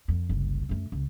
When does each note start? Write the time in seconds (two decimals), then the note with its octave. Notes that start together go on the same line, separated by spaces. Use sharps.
0.08 F2
0.29 F#1 C2
0.69 F#2 A3
0.92 C#2